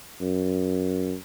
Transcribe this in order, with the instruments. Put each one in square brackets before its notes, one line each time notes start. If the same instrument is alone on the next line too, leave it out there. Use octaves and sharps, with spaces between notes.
[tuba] F#2